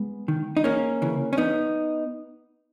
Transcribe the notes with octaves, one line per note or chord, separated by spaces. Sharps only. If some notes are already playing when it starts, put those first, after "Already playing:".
Already playing: G#3 B3
D#3
D#4
E2 A#3 C#4
C#3 E3
C#4
E2 B3 D#4